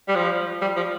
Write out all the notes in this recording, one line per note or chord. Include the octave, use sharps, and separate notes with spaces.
G3
F3
G3
F3